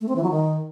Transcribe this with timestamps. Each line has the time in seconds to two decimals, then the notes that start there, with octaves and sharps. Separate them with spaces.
0.01 A3
0.08 C4
0.16 E3
0.23 F#3
0.31 D#3